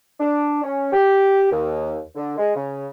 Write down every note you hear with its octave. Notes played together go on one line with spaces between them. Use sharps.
D4
C#4
G4
D#2
D3
G#3
C#3